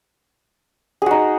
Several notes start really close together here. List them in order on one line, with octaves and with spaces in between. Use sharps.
G#4 F#4 D#4